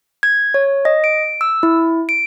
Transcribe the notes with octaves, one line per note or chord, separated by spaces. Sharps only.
G#6
C#5
D#5
D7
E6
E4
D7